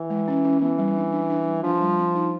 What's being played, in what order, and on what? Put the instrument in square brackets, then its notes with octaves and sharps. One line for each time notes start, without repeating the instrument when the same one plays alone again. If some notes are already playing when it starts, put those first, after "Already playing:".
Already playing: [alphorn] E3
[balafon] G#3
C#4
C#4
[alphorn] E3 [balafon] B3
[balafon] G3
D4
D4
D4
G3
[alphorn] F3 [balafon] D4
[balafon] G3
C4
D#4